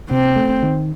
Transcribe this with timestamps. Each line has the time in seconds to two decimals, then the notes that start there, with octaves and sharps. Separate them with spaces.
0.10 C3 C4
0.36 A3
0.63 D#3